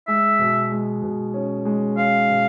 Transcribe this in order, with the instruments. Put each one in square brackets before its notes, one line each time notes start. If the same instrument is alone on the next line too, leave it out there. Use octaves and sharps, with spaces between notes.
[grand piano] G#3 [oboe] E5
[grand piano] B2
G#3
B2
C#4
G#3
[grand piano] C#4 [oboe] F5
[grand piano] B2